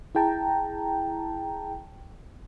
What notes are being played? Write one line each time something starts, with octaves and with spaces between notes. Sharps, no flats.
E4 G#4 G5 A5 A#5